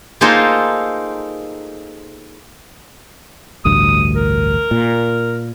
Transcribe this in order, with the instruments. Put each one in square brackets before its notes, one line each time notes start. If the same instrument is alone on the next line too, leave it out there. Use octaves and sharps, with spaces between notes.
[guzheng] A#3 D#4 F4 G#4 A4 C5
[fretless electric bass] A1 D2 G2 [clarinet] D#6
[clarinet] A#4
[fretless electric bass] A#2